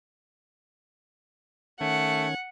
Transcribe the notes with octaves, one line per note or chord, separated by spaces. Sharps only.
D#3 A3 C#4 F#5 G#6